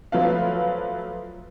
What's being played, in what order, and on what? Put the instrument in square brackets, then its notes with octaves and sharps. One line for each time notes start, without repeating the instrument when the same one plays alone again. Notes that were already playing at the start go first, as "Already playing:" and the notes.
[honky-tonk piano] F3 F#3 A3 B4 F5